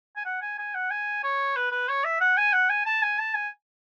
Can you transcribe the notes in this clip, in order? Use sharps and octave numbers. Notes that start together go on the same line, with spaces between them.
G#5
F#5
G#5
G#5
F#5
G#5
C#5
B4
B4
C#5
E5
F#5
G#5
F#5
G#5
A5
G#5
A5
G#5